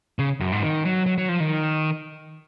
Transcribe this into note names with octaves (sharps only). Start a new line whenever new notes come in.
C#3
F#2
G#2
D#3
F#3
F#3
F#3
F3
D#3